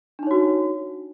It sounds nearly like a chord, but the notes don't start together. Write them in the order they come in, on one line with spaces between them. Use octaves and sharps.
D4 D#4 C#5 F#4